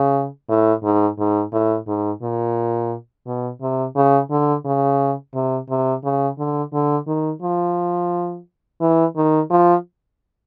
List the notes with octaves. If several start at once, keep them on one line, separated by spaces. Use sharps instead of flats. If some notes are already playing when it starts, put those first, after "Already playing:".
Already playing: C#3
A2
G#2
G#2
A2
G#2
A#2
B2
C3
C#3
D3
C#3
C3
C3
C#3
D3
D3
D#3
F3
E3
D#3
F3